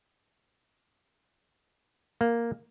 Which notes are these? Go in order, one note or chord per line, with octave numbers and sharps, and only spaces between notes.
A#3